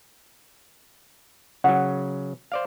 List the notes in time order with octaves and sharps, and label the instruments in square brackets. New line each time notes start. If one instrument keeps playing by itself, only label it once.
[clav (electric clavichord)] C#3 F#3 [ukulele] F#5
[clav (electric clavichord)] C5 D5 F5